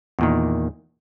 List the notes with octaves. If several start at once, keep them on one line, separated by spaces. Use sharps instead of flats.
E2 A#2 D#3